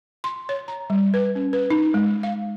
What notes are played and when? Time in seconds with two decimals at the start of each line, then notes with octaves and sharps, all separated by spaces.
0.24 C6
0.49 C#5
0.68 A#5
0.90 G3
1.14 B4
1.35 C#4
1.53 B4
1.70 D#4
1.94 G#3
2.23 F5